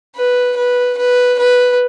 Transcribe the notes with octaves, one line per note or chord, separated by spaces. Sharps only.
B4
B4
B4
B4